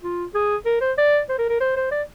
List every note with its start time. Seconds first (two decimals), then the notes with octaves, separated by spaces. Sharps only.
0.03 F4
0.34 G#4
0.65 A#4
0.81 C5
0.98 D5
1.29 C5
1.38 A#4
1.49 A#4
1.60 C5
1.76 C5
1.91 D5